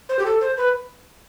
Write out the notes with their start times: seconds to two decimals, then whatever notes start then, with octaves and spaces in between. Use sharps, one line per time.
0.09 C5
0.19 G4
0.25 A4
0.41 C5
0.57 B4